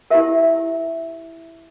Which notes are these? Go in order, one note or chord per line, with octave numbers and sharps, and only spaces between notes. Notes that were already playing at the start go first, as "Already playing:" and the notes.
E4 G4 A#4 E5